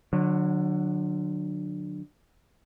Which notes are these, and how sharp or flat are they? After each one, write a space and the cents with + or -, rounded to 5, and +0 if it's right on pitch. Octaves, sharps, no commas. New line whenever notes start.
D3 +20 F#3 -25